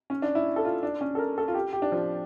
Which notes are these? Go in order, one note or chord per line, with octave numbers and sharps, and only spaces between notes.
C#4
D4
E4
A4
F4
D4
C#4
A4
A#4
A4
F4
G4
G4
D4
F3